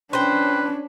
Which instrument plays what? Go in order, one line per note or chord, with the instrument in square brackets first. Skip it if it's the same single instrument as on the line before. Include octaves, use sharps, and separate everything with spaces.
[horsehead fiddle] C#4 D4 [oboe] B4 [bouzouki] C5 G5